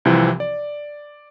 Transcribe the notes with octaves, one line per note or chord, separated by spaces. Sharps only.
C2 C3 E3 F3 C4
D5